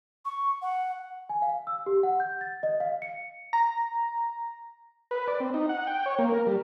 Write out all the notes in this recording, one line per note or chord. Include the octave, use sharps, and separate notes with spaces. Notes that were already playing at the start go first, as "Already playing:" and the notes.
C#6
F#5
G#5
F5
E6
G4
F#5
G6
A6
D#5
F5
C#7
A#5
B4
D5
C4
D#4
F#5
G5
C#5
A#3
A#4
G3